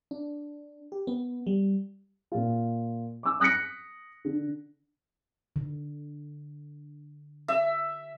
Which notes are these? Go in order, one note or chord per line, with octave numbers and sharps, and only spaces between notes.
D4
G4
B3
G3
A#2 F4
D6 E6
D#6 F#6 A#6 B6 C#7
D3
D3
E5